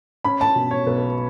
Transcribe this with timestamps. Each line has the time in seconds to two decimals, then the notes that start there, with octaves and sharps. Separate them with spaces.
0.24 C#4 B5
0.41 A5
0.55 B2
0.71 C#5
0.87 B1 B4